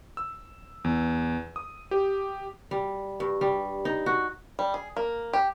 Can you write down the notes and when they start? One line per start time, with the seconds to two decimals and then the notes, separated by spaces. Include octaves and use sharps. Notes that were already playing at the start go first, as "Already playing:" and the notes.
0.17 E6
0.84 E2
1.56 D#6
1.91 G4
2.71 G3
3.20 G2
3.41 G3
3.85 D#4
4.06 F#4
4.59 G3
4.74 G#4
4.96 A#3
5.33 G4